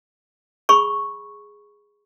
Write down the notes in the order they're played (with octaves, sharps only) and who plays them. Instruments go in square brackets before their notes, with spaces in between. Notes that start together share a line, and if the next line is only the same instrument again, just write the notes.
[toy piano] G#4 B5 C#6